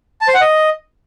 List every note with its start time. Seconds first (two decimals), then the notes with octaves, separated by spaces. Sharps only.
0.21 A5
0.28 C5
0.34 F#5
0.41 D#5